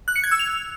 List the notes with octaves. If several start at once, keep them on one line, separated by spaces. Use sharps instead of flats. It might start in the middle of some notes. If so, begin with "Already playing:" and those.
F#6
C#7
G#6
E6
F7